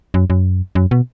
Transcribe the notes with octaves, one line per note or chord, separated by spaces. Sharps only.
F#2
F#2
F#2
B2